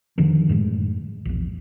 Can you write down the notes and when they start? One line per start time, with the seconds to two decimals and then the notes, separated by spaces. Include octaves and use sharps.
0.18 F2 D3 D#3 F3
0.49 F#2 A2 G#3
1.25 A#1 E2